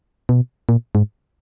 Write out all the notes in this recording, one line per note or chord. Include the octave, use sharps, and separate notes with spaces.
B2
A#2
G#2